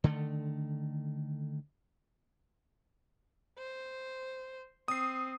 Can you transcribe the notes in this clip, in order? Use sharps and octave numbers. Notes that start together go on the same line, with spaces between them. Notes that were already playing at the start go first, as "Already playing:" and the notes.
D3 D#3 A3
C5
C4 D#6 C7